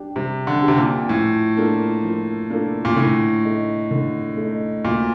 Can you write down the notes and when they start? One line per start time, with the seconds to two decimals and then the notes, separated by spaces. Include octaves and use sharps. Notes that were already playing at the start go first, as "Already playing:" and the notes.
Already playing: G3 D4 G4
0.16 C3 G3
0.47 D3
0.62 D4 G4
0.68 C3
0.78 A#2
1.09 A2 F3
1.56 A#3 D4 F4 A4
2.03 F3
2.50 A#3 D4 F4 A4
2.85 A#2
2.96 A2 D3
3.44 A3 D#4
3.91 D3
4.37 A3 D#4
4.84 D2 A#2